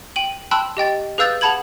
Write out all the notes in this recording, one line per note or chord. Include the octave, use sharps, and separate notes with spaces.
G5 D#7 F#7
G5 A5 B5 C6 E6 F#6
G4 D#5 G5 A6
G#4 B4 F5 E6 G6 A6
G#4 F#5 A5 B5 G#6 F#7